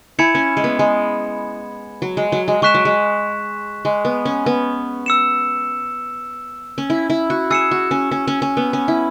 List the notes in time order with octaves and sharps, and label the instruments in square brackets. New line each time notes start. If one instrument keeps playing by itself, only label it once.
[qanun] E4 [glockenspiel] G#5 B5 G#6 C#7 E7
[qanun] C#4
G#3
B3
G#3
F#3
G#3
F#3
G#3
[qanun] G#3 [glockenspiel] C#6 F#6 B6 E7
[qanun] F#3
G#3
G#3
B3
C#4
B3
[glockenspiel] E6 C#7 E7
[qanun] C#4
E4
E4
F#4
[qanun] G#4 [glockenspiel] E6 C#7 E7
[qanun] F#4
C#4
C#4
C#4
C#4
B3
C#4
E4